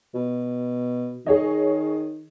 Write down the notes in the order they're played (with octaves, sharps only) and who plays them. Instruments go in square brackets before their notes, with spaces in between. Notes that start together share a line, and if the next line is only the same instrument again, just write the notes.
[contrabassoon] B2
[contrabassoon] D#3 [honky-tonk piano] G#4 C#5 D#5